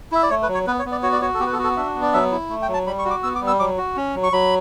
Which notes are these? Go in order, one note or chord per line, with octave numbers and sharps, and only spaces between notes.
E4 E5
D5
A3 C#5
B4
F#3
C#5
B3 B4
C#5
B3
D5
F#4 C#5
D5
F#4 C#5
A4
B3 G4
B4
A4
F#4
A4
D4 E5
B3
D5
F#3 E5
E4
A3
G5
F#3
A5
G3 B5
C#6
F#4
D6
B3 E6
D6
G3
E6
F#3 D6
F#4
C#4
F#3
C#6
F#3 B5